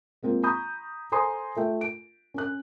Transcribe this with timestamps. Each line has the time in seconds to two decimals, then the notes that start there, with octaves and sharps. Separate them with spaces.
0.23 G#3 A#3 C4 F4
0.43 A#5 B5 C#6 D#6 G6
1.12 A4 C5 G#5 A#5 C6 D#6
1.57 A3 F4 E5 G5
1.81 D7
2.34 C#4 F#6